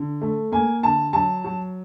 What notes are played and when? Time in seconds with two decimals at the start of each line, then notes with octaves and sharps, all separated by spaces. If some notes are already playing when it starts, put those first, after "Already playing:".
Already playing: D3
0.22 A3
0.52 A#3 G#5
0.83 D3 A5
1.13 F#3 A5
1.44 F#3